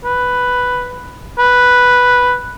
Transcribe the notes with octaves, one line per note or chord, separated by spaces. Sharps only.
B4
B4